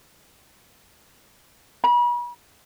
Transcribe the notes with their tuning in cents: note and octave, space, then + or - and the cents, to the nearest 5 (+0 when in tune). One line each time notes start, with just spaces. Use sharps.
B5 -40